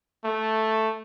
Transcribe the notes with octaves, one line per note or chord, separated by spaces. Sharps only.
A3